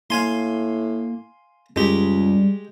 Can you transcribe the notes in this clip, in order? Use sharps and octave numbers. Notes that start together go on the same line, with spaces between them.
A2 A#3 F5 G#5 C6
C#2 F#2 G3 G#3 G4